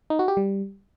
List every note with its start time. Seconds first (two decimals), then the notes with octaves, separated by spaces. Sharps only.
0.10 D#4
0.19 F#4
0.28 G4
0.37 G3